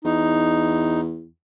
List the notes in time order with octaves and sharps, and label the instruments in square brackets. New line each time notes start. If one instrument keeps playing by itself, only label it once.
[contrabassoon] E2 [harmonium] D#4